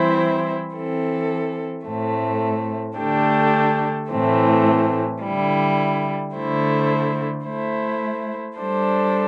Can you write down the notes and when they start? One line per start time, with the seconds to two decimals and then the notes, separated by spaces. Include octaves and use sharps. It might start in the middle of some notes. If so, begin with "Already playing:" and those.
Already playing: E3 G3 C4 E4 C5
0.75 E3 C4 A4
1.87 A2 A3 C4
2.98 D3 A3 D4 G4
4.10 A2 E3 A3 C4
5.22 D3 G3 E4
6.34 D3 A3 E4 C5
7.46 A3 E4 C5
8.58 G3 D4 A4 C5